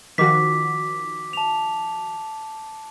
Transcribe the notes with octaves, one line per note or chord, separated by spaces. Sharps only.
D#3 F3 F#4 D6 B6
A5 F7